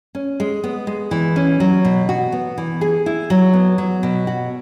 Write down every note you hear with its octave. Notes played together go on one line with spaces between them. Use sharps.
C#4
G#3
B3
G#3
E3
C#4
F#3
B2
F#4
B3
E3
G#4
E4
F#3
B3
F#3
B2
F#4